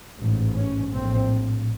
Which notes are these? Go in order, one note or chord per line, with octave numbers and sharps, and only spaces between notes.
A1 G#2
C#4
A#1 A2 C4